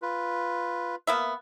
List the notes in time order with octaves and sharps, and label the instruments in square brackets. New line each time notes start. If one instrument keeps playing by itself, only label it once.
[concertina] F4 B4
[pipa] A#3 B3 E5